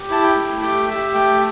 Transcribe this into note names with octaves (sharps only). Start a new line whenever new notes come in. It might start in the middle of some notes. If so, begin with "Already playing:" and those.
Already playing: G4
E4 A5
G5
A3
G4 G5
G4 E5
A3 G5